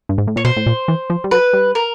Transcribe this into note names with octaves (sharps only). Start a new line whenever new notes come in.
G2
G#2
A2
A#2 C#5
B2 C5
A2
A#2
E3
F3
G3
F#3 B4
G3
A#4